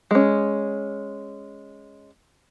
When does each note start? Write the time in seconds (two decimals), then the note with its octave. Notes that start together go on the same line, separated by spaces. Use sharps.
0.11 G#3 C#4